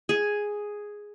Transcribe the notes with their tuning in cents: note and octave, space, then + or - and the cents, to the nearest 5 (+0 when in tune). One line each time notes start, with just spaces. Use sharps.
G#4 +0